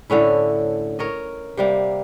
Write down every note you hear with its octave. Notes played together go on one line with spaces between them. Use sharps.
A2 D3 C#4 E4
A#4 C#5 D#5
C3 G3 A#3